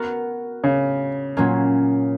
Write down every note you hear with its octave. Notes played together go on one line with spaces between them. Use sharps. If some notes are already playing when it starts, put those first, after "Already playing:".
Already playing: B3 F#4 A#4
C#3
A#2 F#3 A#3 C#4